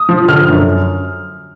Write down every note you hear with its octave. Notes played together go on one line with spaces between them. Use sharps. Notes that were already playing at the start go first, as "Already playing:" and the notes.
Already playing: D#6
F3
D3 F6
F#2